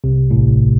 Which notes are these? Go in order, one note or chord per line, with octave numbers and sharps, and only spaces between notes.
C2 C3
A1 A2